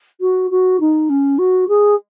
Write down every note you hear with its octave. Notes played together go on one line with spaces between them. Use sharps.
F#4
F#4
D#4
C#4
F#4
G#4